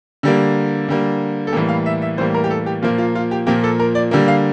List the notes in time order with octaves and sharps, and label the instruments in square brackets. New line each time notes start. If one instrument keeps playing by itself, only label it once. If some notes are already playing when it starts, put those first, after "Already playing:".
[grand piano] D3 G3 A#3
D3 G3 A#3
A4
A2 E3 G3 A#3 G4
F5
E5
E5
A2 E3 G3 A#3 C5
A#4
G4
A4
G4
A#2 F3 A#3 F4
F4
F4
G4
A#2 F3 A#3 G4
A4
A#4
D5
D3 G3 A#3
F5